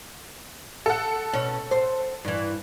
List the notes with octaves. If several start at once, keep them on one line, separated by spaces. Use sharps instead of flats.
A4 F#5
B2 C#4
C5
G2 E3